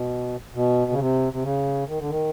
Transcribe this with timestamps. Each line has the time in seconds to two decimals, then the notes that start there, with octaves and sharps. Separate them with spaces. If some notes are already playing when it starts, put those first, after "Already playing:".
Already playing: B2
0.55 B2
0.91 C#3
0.99 C3
1.33 C3
1.44 C#3
1.88 D#3
2.00 D3
2.10 D#3